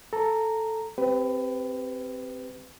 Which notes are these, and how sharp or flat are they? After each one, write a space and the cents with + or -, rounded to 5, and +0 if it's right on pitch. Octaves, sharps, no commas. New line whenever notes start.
A4 +0 A#5 -10
C4 +0 G4 +0 B4 +25